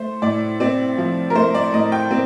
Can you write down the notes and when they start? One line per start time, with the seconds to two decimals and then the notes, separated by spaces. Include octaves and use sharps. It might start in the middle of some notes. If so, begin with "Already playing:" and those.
Already playing: A3 C5
0.22 A2 D5
0.60 C4 D5
0.98 F3
1.30 A#4
1.35 A3 C5
1.54 D5
1.73 A2 D#5
1.92 G5
2.11 C4